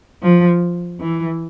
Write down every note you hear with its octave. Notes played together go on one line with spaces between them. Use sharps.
F3
E3